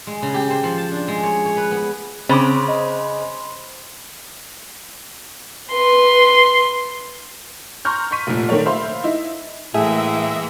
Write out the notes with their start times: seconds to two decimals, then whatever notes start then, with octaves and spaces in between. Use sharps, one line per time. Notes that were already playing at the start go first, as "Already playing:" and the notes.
0.07 G#3
0.22 C#3
0.34 G4
0.50 C5
0.64 F3
0.78 A5
0.91 D4
1.08 G#3
1.23 C#5
1.45 C#5
1.57 B4
1.71 B3
2.29 C#3 C4 C5 B5 C6 D6
2.68 D#5
5.72 B4 C6
7.85 A#5 C6 C#6 F6 G6
8.11 C6 C#6 B6 D#7
8.27 F1 A#2
8.49 D#3 A3 A#4 C#5 D5
8.66 C5 E5 F5 B5 C6
9.03 D#4 E4
9.74 A2 E3 G#3 A#3 G#4 E5